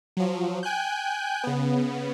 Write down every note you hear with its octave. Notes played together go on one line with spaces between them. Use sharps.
F3 F#3
G5 G#5 F#6 G6
C#3 B3